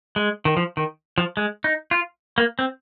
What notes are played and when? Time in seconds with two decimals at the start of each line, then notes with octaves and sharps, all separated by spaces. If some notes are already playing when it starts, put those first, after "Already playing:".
0.16 G#3
0.45 D#3
0.57 F3
0.77 D#3
1.18 F3
1.37 G#3
1.64 D#4
1.91 F4
2.38 A#3
2.59 C4